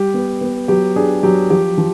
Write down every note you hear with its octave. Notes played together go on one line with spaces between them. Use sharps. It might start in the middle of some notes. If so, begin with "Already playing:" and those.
Already playing: G3 G4
B3
B3
F#3 G4
D4 G#4
F#3 G4
F3 G4
F3